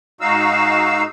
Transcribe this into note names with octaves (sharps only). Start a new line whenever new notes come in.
G#2 D#4 F#4 F5 E6